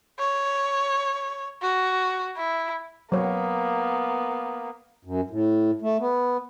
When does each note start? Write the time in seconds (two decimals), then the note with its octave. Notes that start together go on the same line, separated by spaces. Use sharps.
0.19 C#5
1.62 F#4
2.37 E4
3.12 F#3 A#3 B3 C#5
5.05 F#2
5.30 A2
5.82 A3
6.00 B3